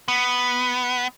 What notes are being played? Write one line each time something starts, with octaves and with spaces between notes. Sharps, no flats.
B3